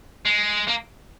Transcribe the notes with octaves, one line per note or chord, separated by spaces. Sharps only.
G#3
A#3